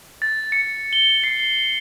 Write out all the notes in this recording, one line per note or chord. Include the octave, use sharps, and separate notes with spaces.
A6
C#7
G7
C7